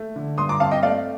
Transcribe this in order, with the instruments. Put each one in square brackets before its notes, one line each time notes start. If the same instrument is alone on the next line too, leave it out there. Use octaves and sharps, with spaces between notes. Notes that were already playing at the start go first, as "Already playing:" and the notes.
Already playing: [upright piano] A3
D3
G2 C6 D#6
A#5 D6
C4 F5 A5
D#5 G5
A3 D5 F5